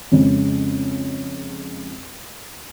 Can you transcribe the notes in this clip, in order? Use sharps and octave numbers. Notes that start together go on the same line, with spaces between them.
F2 C#3 G#3